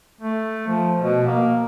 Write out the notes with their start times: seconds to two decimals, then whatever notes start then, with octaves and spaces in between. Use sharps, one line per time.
0.21 A3
0.68 F3
0.99 B2
1.27 A#3